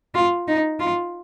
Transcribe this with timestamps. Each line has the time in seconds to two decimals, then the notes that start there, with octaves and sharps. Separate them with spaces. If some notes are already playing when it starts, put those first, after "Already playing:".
0.15 F4
0.48 D#4
0.80 F4